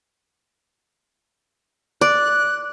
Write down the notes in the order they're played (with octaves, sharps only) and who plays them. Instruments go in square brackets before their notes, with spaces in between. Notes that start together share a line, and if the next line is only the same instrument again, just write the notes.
[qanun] D5 [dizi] F#6